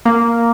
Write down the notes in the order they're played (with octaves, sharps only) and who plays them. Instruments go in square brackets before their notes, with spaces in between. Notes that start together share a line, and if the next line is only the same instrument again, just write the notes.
[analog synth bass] A#3